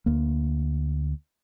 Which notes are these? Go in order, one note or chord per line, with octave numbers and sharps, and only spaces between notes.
D2 A#3